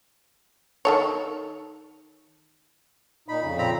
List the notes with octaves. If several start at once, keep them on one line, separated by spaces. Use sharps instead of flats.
D#3 A4 C#5
A#2 D#4 B5
F2 C#3
A#2 C4 A#5 B5